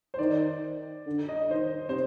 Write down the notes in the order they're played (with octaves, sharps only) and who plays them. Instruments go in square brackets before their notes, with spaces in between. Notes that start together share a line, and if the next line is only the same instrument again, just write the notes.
[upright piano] C5
[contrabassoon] D#3 [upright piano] D5
[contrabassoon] D3
[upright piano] D#5
[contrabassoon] D#3 [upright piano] C5
[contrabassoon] C3 [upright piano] C5